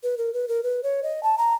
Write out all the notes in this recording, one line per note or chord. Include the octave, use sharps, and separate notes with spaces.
B4
A#4
B4
A#4
B4
C#5
D#5
A5
A#5